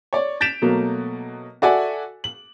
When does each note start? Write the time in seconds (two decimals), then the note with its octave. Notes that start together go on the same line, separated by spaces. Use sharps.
0.13 C#5 D5
0.41 G6 A6 B6 D7 E7 F7
0.62 B2 F#3 A3 A#3
1.62 F#4 A4 D5 E5 F#5 G#5
2.24 F#7